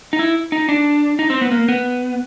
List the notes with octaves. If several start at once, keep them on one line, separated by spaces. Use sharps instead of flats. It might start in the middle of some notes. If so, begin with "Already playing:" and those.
D#4
E4
D#4
D4
D#4
C4
B3
A#3
B3